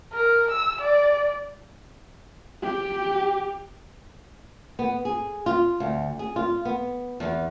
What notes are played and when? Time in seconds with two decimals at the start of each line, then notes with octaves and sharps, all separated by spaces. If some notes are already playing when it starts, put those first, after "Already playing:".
0.12 A#4
0.51 E6
0.81 D5
2.62 G4
4.79 B3
5.05 G#4
5.46 F4
5.80 D2
6.19 G#4
6.36 F4
6.65 B3
7.20 E2